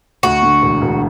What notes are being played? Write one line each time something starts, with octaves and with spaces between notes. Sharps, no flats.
D2 F#4
D3
E1
E1